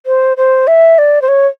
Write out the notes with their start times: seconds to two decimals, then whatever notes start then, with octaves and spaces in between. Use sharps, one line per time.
0.06 C5
0.37 C5
0.67 E5
0.98 D5
1.22 C5
1.28 C#5